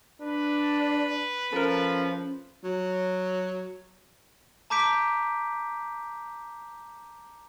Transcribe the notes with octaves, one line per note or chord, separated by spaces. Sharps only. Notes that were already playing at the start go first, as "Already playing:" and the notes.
D4 B4
F3 C#4 A4 A#4
F#3
A5 A#5 D6 G6 B6 D7